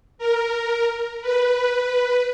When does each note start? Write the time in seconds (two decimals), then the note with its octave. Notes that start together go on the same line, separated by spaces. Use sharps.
0.18 A#4
1.21 B4